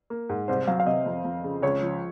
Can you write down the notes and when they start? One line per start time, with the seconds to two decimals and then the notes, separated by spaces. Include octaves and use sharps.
0.10 A#3
0.29 G#2
0.48 C2 C5
0.67 F#3 F5
0.80 F5
0.86 C3 D#5
1.06 F2
1.25 F2
1.44 C#3
1.62 C#2 C#5
1.82 F3